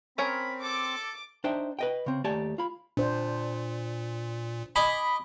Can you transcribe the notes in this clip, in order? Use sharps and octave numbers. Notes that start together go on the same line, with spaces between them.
C4 C#4 A#4 C#5 B5
A4 D6
D4 D#4 C5 E5 G5
B4 D#5 G5
C#3 C4
D#2 A3 G4 D5 G#5 A5
F4 B5
A#2 D4 C5
D#5 G#5 B5 D6